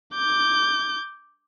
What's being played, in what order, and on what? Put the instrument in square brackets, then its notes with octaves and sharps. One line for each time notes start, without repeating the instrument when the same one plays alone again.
[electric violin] D6 G6